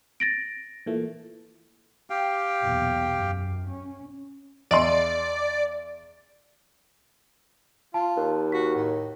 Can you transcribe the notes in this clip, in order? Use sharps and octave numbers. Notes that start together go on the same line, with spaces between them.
A6 A#6 D7
A#2 E3 A3
G4 F5 G5
B1 E2 A#2
F#2
C#4
E2 D5 D#5 C6
F4 A5
D#2
F#4 B6
A2